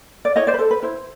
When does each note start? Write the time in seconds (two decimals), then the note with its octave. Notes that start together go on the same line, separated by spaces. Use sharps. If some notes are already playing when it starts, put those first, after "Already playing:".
0.25 D5
0.36 E4 C#5 D#5
0.47 C5 D5
0.54 B4
0.59 A4 C5
0.71 B4
0.83 E4 C5